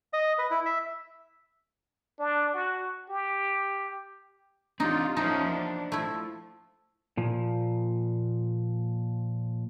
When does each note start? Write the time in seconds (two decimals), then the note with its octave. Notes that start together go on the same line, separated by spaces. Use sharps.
0.13 D#5
0.38 B4
0.51 E4
0.65 E5
2.19 D4
2.54 F#4
3.10 G4
4.80 C4 D4 D#4 F4 G4
5.17 F3 A#3 C#4 D#4 C5 E5 A5
5.50 D4
5.92 F3 A3 E4
7.17 A#2 F3